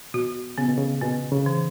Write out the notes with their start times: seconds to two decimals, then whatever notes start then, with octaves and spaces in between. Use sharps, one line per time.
0.14 B2 F#4
0.58 C#3 B3
0.69 B2
0.78 C#3
1.02 B2 B3
1.32 C#3
1.46 E3